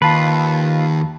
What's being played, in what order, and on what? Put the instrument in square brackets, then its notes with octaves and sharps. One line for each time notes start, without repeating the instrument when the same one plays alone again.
[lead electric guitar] D#2 [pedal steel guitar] F4 B4 [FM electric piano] A5 B5